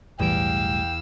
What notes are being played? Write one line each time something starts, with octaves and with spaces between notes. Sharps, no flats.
B1 E2 A2 G3 F5 G5 E6 D7